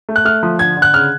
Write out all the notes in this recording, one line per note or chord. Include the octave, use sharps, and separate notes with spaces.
A3
F#6
A3 F6
F3
D3 G#6
D3
F#6
C#3 F6